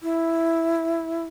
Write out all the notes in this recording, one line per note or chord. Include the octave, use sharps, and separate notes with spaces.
E4